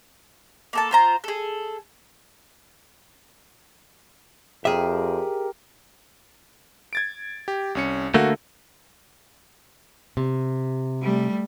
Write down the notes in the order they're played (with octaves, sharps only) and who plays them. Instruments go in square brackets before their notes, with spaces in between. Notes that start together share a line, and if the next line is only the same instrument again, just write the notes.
[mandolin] A#3 A4 A5
F4 C5 A#5
G#4 A4
[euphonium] F2 [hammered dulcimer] G4 A#4 [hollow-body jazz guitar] G#4 E5
[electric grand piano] G#6 A6 D7
G4
C2 C#4 C#7
[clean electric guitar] D3 A3 A#3 [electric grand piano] F#4
[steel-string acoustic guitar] C3
[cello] G3 A3